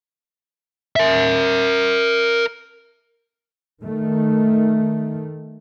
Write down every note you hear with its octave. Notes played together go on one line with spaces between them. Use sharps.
A#4 E5
D#3 A3